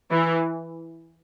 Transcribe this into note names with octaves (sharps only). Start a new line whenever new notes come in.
E3